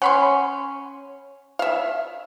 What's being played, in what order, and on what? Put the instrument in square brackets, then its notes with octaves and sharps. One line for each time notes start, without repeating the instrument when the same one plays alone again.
[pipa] C#4 [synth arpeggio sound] F#5 B5 C6
[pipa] E5 F5